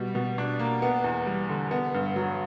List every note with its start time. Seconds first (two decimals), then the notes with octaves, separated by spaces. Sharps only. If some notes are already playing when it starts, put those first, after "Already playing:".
Already playing: B2 G3
0.15 B2
0.38 D4
0.59 A#3
0.82 B3
1.04 E2
1.26 G3
1.49 D3
1.71 B3
1.94 G2
2.16 F#3